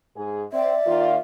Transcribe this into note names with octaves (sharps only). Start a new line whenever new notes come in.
G#2 G#4
C4 D5 E5
D#3 A#3 F4